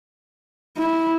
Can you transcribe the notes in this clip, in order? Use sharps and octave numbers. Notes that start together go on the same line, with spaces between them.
E4